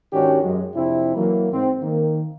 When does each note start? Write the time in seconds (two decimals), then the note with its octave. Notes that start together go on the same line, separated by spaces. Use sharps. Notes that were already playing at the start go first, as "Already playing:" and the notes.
0.12 G#2 D#3 C#4 D4 F#4 G4
0.42 F#2 G#3
0.75 F2 C3 C4 D4 E4
1.16 E3 F#3 A#3
1.52 G#2 C4
1.81 D#3 A#3